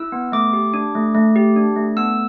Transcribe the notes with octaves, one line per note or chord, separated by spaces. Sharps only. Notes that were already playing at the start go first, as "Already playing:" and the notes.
Already playing: E4 E6
B3
A3 D6
G4
D4
A3
A3
G4
D4
A3
B3 E6